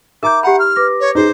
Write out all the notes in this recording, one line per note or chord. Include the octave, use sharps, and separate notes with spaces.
D#4 A#4 E5 A#5 D6 G6
G4 F#5 B5
F6
B4 D6 A#6
C#5
D#4 G#4 C5